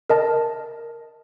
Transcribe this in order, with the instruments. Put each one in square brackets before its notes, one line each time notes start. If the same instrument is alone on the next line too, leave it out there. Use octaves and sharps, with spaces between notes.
[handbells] A#4 D#5 A5